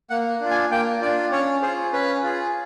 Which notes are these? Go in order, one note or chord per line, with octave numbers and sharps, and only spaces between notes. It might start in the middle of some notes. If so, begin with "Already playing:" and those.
A#3 F#5
D4 F4
G#5
A#3 G5
D4 F4 D5
C#4 C#5
F4 G#4 C5
C#4 B4
F4 G#4